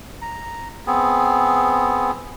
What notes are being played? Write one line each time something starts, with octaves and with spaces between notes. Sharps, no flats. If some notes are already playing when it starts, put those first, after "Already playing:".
A#5
B3 C4 G#4